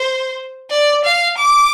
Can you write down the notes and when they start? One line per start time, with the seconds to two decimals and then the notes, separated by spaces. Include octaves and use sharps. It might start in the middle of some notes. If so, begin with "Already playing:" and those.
Already playing: C5
0.70 D5
1.05 F5
1.38 D6